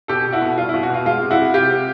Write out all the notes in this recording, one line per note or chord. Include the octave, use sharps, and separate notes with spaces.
B2 G4 A4
B2
E4 F#4
B2
G3 F4
B2 E4
F#4
B2 F4
G#3 F4
C3
E4 F#4
C3
C3 F4 G4
C3